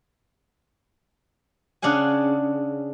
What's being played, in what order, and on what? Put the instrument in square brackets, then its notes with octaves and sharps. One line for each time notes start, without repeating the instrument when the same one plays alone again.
[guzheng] C#3 D4 F5 F#5 G#5